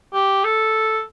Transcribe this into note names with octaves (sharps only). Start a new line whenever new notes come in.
G4
A4